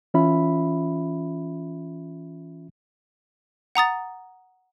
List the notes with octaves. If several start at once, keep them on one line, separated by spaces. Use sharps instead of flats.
E3 C#4 F4 E5 B5
F#5 A#5 D#6 A6